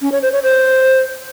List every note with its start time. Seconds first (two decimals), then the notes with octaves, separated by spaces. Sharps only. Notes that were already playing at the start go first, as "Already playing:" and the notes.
0.02 C#4
0.12 C#5
0.22 C5
0.32 C#5
0.43 C5